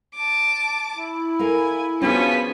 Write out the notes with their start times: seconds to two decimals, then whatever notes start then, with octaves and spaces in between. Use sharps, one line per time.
0.15 A5 D6
0.97 E4
1.39 A4 A#4 F5 G#5
2.02 F3 B3 C#4 D4 F#4 G#4 B6